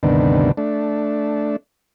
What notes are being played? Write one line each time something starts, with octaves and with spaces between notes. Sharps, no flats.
D2 G2 C3 D#3 B3 D4
A3 D4